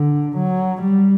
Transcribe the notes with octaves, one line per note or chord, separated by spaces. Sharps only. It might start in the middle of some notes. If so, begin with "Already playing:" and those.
Already playing: D3
F#3
G3